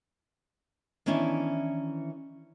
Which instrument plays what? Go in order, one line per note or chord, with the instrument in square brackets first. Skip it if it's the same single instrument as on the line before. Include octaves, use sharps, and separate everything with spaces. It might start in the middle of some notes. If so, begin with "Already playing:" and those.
[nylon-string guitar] D#3 E3 B3 C#4 D4 E4